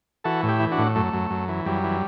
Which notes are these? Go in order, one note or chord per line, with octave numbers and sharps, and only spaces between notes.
E3 F#4 A4
A2
E4 G4
E3
D4 F#4
A2
F#2 A3
F#2
F#2
E3
F#2 G3
E3